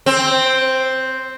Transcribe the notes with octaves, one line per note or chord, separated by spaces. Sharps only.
C4